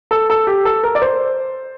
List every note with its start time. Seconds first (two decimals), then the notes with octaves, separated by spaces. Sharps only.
0.11 A4
0.30 A4
0.47 G4
0.65 A4
0.83 A#4
0.95 D5
1.02 C5